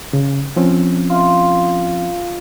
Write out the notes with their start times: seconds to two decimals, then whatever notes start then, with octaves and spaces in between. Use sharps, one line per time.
0.13 C#3
0.56 F3 C4 C#4
1.10 F4